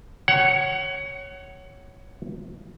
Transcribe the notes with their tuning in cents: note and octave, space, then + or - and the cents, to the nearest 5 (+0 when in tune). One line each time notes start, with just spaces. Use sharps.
C#5 +0 F#5 +25